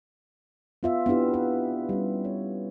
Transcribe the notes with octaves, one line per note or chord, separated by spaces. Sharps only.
B3 F4 E5
B3 C4 D4 E4 G4
B4
G3 C#4
C#5